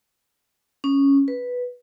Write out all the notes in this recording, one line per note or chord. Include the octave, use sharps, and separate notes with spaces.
C#4
B4